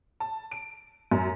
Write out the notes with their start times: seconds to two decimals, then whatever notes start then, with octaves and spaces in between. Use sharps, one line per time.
0.20 A5
0.51 D7
1.11 F#2